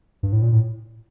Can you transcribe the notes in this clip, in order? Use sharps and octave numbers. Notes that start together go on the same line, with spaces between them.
G2
A2
A#2
A2